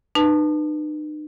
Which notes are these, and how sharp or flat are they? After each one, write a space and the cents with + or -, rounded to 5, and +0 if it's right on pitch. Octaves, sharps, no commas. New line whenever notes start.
D#4 -40 B4 +0 A5 +0